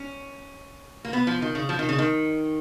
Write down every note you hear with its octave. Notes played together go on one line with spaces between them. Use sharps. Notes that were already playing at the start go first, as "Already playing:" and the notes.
Already playing: C#4
A#3
B3
F3
D#3
C#3
F3
D#3
C#3
D#3